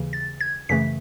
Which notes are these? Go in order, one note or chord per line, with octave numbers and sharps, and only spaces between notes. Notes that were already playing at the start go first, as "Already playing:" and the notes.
Already playing: D#2 C#3 E3
A6
G#6
F#2 C#3 E3 A3 B6